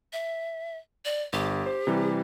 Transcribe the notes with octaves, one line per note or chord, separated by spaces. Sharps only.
E5
D5
G1 G4
C5
C3 E3 G3